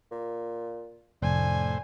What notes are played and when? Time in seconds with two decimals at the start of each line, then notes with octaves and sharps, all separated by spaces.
0.12 A#2
1.22 F1 A2 D4 C5 G#5